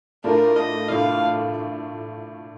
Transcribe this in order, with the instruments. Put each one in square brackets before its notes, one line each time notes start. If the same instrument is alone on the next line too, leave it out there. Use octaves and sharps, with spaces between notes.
[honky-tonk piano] A2 A3 D4 F4 [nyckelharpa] A#4
[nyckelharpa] D#5
[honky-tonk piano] A2 A3 D4 F4 [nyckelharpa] F5